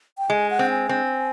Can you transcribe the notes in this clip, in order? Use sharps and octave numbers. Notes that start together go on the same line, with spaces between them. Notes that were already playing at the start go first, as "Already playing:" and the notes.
G5
G#3 G#5
F#5
C4
G#5
C4